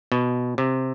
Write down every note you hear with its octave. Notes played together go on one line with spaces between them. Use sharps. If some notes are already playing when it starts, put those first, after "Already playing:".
B2
C3